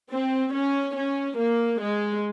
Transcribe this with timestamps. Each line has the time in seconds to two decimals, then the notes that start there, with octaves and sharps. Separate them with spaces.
0.11 C4
0.54 C#4
0.96 C#4
1.38 A#3
1.80 G#3